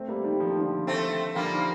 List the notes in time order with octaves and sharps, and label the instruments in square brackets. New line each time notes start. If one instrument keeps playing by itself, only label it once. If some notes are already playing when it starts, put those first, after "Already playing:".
Already playing: [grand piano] A3 C4
G3 A#3
D#3 G3
F3
D#3
D3 F3
[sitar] A3 C4
[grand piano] D3 F3 [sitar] G3 A#3
[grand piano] D#3